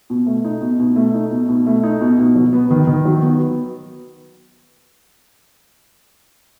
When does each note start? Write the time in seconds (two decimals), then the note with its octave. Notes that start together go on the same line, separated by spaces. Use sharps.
0.10 B2
0.26 A3
0.44 D#4
0.61 B2
0.79 B2
0.96 A3
1.14 D#4
1.31 B2
1.48 B2
1.66 A3
1.83 D#4
2.01 B2
2.19 B2
2.35 F#3
2.53 B3
2.70 D#3
2.87 D#3
3.05 F#3
3.22 B3